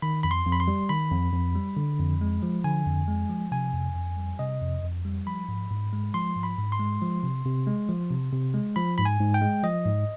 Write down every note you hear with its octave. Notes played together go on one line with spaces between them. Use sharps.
D#3 B5
F2 B5
C6
F2
B5
C6
G3
D#3 B5
F2
F2
G3
D3
F2
G#3
F3
D3 G#5
F2
G#3
F3
C3 G#5
F2
F2
G3
C3 D#5
F2
F2
G3
F3 B5
G#2
G#2
G#3
F3 C6
G#2
B5
G#2
C6
G#3
F3
C3
C3
G#3
F3
C3
C3
G#3
F3 B5
G#2 B5
G#5
G#2
G5
G#3
F3 D#5
G#2